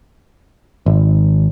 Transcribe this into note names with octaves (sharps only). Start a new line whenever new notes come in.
G#1